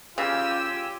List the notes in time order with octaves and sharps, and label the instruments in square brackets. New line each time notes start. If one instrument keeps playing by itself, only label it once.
[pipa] C#3 [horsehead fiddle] F4 G#5 [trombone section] G4 [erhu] E6